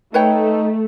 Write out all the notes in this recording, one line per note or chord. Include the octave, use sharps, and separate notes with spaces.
A3 D#4 B4 C#5 G5